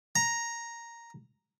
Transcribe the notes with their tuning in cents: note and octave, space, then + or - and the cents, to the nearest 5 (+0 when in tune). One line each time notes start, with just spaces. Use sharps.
A#5 +0